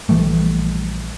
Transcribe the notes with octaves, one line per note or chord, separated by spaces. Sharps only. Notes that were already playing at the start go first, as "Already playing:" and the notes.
A#1 E3 G3 A3